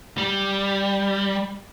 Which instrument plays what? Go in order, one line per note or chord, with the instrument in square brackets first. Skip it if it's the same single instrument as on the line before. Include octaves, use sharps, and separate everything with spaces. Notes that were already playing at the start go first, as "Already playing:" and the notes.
[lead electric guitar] G3